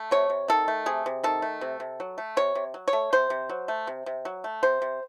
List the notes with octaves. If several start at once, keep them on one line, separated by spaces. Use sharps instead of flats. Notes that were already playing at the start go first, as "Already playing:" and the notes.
Already playing: A3
C3 C#5
C3
D#3 A4
A3
C3 G#4
C3
D#3 A4
A3
C3
C3
F#3
A3
C3 C#5
C3
F#3
C#5
A3
C3 C5
C3
F#3
A3
C3
C3
F#3
A3
C3 C5
C3